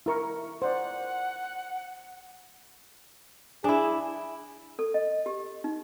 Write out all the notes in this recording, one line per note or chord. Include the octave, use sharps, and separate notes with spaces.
E4 A#4 C#6
C5 D5 F#5
D4 E4 G#4
A4
D#5
G4
D#4